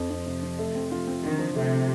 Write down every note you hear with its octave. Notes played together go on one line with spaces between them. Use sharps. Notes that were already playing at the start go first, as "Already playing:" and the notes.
Already playing: F2 F3
F2
C3
C3
A3
C4
F4
C4
D3 D#3
F3
C3 A3